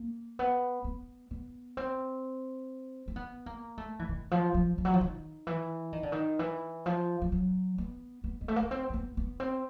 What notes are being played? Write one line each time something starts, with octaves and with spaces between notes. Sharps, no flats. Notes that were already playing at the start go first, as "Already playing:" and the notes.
Already playing: A#3
B3
B3
B3
C4
C4
B3
A#3
A3
E3
D#3
F3
F3
F3
F#3
F3
D#3
E3
D#3
D3
D#3
E3
F3
F3
F#3
B3
B3
G#3
A3
A#3
B3
C4
A#3
B3
B3
C4